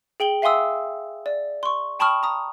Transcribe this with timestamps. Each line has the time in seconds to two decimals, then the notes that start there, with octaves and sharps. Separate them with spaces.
0.20 G#4 G5 F#7 G7
0.42 E5 F5 G#5 C6 D#6 E6
1.26 D5
1.63 C6 C#6
2.00 G5 A5 B5 C#6 D#6 F6
2.23 A#5 D#6